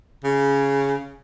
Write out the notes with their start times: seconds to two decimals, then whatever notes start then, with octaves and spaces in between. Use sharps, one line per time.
0.24 C#3